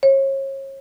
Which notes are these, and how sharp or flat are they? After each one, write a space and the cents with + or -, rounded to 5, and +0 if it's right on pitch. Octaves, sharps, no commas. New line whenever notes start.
C#5 -35